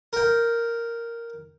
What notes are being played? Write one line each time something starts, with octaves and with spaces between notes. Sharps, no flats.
A#4 G5